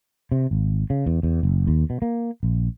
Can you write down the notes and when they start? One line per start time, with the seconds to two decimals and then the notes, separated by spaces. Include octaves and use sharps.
0.32 C3
0.51 G#1
0.90 C#3
1.06 E2
1.23 E2
1.43 F#1
1.67 D#2
1.90 B2
2.02 A#3
2.43 A#1